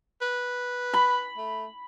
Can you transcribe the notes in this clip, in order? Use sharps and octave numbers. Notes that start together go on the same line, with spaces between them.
B4
B5
A3